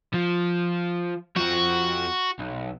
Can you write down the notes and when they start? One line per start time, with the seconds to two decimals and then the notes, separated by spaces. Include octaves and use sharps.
0.14 F3
1.37 F2 F3 F#4
2.39 B1